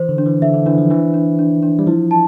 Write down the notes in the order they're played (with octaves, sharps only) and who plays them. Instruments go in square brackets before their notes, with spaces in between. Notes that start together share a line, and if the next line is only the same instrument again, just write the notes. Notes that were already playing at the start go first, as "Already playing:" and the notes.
Already playing: [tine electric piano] E3 [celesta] C5
[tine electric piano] D3
[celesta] D4
[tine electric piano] E3
[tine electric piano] D3 [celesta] E5
[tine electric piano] D3
[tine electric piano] E3 [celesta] D4
[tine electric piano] F3
[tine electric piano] E3 [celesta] D4
[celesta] D4
D4
D4
[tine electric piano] G3
[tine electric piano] F3 [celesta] E4
[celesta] A5